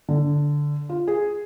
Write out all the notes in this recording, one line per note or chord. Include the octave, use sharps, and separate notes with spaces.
D3
F4
G#4